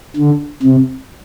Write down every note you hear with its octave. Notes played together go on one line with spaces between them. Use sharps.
D3
C3